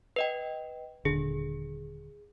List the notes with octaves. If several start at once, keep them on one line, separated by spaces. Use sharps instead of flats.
B4 D#5 G5
D#1 D3 G#4